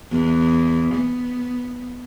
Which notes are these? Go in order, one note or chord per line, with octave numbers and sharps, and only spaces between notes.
E2
B3